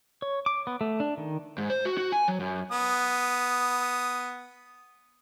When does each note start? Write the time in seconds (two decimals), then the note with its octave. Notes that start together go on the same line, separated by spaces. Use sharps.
0.22 C#5
0.46 D6
0.67 B3
0.81 A3
1.00 D4
1.17 D#3
1.58 G#2
1.70 C5
1.85 F#4
1.98 F#4
2.12 G#5
2.28 F#3
2.40 F#2
2.72 B3 D#6